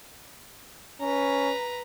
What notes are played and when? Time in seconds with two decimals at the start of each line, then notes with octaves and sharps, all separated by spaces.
1.01 C#4 B4 A#5